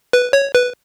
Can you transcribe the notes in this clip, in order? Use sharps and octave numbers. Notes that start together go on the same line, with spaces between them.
B4
C#5
B4